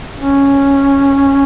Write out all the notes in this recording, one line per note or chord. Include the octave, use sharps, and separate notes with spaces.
C#4